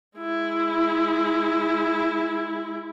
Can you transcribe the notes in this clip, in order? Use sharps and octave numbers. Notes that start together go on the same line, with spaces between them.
G#3 E4